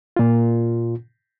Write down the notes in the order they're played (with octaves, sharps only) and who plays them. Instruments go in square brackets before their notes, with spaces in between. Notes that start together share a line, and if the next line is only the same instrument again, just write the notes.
[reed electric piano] A#2 F4